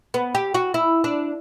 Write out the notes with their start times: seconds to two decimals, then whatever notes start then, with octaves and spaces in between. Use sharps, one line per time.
0.14 B3
0.35 G4
0.54 F#4
0.74 E4
1.04 D4